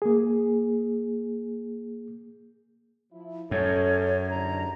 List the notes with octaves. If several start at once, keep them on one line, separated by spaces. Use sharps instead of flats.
A#3 G#4
F3 E4
F#2 C#4 A4 C#5
C2 G#2 D3 A#5